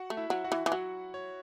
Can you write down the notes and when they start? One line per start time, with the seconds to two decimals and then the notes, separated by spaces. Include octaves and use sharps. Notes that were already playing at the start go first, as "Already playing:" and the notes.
Already playing: F#4 F#5
0.10 A3
0.17 E4 E5
0.30 F#3
0.44 F#4 F#5
0.52 E3
0.66 E3
0.72 F#3 F#4 F#5
1.14 C#5